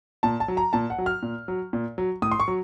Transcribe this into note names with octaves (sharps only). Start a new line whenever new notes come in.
A#2 A5
A5
F#3
A#5
A#2 A5
F#5
F#3
F6
A#2
F#3
A#2
F#3
A2 D#6
C6
C#6
F#3